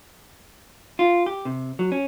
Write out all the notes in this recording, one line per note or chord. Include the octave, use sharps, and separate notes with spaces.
F4
G4
C3
F#3
C#4